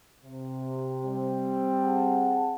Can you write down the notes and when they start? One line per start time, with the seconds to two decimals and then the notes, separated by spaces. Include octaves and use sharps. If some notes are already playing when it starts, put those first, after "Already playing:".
0.24 C3
1.04 G3 C4
1.83 G#4 F#5 A5